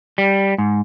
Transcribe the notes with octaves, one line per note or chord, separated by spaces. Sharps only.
G3
G#2